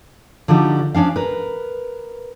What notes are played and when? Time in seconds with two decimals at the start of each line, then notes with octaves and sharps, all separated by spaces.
0.48 D3 F3 D4 D#4 F#4 G4
0.94 F3 C#4 D4 F5
1.16 A#4 B4